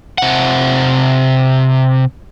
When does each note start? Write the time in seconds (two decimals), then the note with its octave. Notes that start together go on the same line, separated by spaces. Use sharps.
0.18 C3 F#5